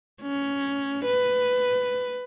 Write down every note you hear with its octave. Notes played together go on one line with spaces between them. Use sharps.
C#4
B4